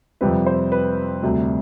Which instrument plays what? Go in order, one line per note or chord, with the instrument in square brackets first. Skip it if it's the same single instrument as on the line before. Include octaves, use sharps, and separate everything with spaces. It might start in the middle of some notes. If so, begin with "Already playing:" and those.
[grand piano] F2 C3 G3 C4 B4
C5
B4
D2 C3 G3